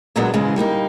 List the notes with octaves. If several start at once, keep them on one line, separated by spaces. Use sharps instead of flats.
A#2 D3 F#3 G#3 B3 D4
G#2 C#3 E3 G#3
G3 A#3 B3 D#4